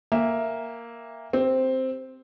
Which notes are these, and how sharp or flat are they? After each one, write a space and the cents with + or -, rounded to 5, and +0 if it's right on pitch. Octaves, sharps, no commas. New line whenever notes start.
A#3 +0 E5 +0 G5 +45
C4 +0 G4 +0